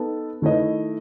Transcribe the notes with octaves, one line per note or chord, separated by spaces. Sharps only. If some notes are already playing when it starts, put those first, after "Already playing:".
Already playing: B3 D#4 A4
D#3 A3 E4 B4 D#5